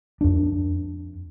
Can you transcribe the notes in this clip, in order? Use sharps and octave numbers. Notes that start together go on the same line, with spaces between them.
F2 D4